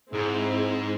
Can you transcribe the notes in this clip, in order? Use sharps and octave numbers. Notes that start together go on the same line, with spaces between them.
G#2 C4 E4 G#4